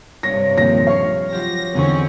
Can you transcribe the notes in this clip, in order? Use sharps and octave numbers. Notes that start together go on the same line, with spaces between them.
G2 C3 C#5 A#6
D#1 A#2 F3 G#3 C4 A#6
C#5 C#6 F6 C7
F#3 F4 G4 A#6
E2 D3 C4 C#4 D#5 G#5 C#6